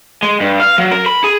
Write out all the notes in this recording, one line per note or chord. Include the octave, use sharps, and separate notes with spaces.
G#3
G2
F5
F#3
A#4
B5
G#4